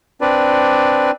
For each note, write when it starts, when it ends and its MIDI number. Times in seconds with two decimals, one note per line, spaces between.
0.21 1.11 60
0.21 1.11 62
0.21 1.11 71
0.21 1.11 74